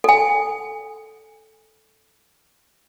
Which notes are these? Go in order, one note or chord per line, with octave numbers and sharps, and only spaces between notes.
A4 G#5